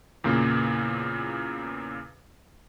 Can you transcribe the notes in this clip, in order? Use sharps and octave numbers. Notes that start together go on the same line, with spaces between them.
E2 A#2 C#3 A#3